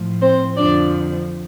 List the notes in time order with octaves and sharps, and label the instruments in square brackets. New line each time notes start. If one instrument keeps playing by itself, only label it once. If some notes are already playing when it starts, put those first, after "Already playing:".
Already playing: [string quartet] A2 F3
C4 C5
F2 D3 F3 D4 D5